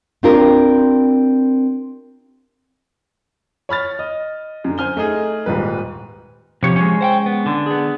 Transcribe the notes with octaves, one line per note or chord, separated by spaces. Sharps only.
C4 D4 F4 G4 A#4
C#5 B5 F6 A6
D#5
F#2 D3
C5 G#5 F6 G7
A3 D#4 G#4
D#1 G#2 G3 B4
C3 F3 G4 C#5
G#3 C#4
C5 F#5 G5
B3
D3
B3 G#4